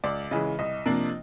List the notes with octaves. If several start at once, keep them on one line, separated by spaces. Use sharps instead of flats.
C#2 D5
C#3 E3 G#3 D#5
C2 D#5
C3 F3 A#3 D4